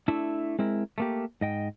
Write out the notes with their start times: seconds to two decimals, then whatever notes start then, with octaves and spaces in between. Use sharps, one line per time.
0.08 A3 D4 E4 E5
0.59 G#3 C4 E4 A#4
0.98 A3 A#3 G4
1.41 G#2 D#5 G5